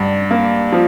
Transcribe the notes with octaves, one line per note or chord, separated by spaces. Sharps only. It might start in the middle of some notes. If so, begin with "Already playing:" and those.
Already playing: G2 D4
A#3
F3